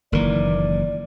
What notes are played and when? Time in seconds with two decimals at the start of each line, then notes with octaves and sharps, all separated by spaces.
0.12 F#1 D#3 E3 A#3 A#4 D5